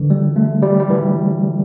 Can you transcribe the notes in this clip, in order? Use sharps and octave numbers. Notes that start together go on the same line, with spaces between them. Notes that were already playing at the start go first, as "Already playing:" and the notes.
Already playing: D3 E3
G3
A3
G3
G3
E3